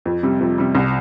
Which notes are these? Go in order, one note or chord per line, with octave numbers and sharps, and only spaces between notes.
F2
C3 G3
F2
C3 G3
C2